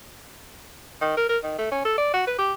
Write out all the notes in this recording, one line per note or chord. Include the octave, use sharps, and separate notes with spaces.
D#3
A#4
A#4
D#3
A3
C#4
A4
D5
F#4
B4
G4